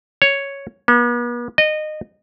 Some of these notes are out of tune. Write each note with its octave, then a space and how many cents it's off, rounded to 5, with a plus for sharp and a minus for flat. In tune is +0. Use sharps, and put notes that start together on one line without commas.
C#5 +0
B3 -45
D#5 -20